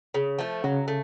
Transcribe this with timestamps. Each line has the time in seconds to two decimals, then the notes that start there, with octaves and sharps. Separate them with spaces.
0.14 C#3
0.39 F3 A3
0.64 C#3 F#3
0.88 A3